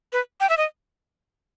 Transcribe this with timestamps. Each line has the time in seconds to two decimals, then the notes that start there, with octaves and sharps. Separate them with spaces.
0.13 B4
0.40 G5
0.50 E5
0.58 D#5